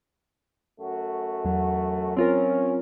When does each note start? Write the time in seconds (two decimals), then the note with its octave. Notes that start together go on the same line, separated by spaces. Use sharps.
0.80 F#2 A3 F#4
1.45 E2 F#3
2.17 C4 C#4 F4 A#4